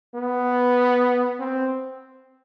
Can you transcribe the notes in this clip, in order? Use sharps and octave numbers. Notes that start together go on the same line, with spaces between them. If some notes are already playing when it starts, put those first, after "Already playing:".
B3
C4